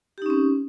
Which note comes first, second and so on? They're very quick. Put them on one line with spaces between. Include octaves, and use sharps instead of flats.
G4 D#4 C#4 C4